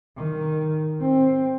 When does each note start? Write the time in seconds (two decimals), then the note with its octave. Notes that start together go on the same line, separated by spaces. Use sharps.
0.17 D#3
1.01 C4